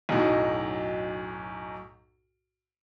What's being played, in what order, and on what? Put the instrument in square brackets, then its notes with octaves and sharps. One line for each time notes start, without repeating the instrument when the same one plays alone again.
[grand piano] B1 F#2 A2 D#4